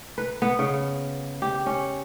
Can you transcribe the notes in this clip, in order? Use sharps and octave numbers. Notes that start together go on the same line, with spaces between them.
B4
B3
C#3
G4
C#4